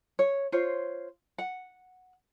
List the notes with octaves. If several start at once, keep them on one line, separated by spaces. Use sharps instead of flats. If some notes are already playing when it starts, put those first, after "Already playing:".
C#5
F4 C5 C#5
F#5